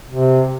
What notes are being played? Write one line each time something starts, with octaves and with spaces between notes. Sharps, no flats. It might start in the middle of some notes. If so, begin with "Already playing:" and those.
C3